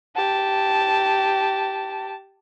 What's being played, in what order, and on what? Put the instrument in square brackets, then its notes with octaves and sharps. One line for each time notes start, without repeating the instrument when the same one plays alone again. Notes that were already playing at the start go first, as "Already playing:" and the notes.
[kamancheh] G4 A5